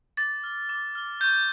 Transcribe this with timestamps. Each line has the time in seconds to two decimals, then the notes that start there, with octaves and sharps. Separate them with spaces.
0.17 D6 A6
0.44 F6
0.69 D6
0.95 F6
1.20 C#6 G6